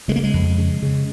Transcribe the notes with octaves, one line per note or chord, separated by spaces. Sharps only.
C#3 G#3
A#3
G#3
F2
C#3
C#3